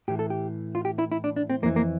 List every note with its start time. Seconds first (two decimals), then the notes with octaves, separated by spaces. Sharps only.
0.08 A2 E3 G4
0.19 A4
0.30 G4
0.75 F4
0.85 G4
0.99 E4
1.12 E4
1.24 D4
1.36 D4
1.50 C4
1.62 F2 A#3
1.66 E3
1.76 A#3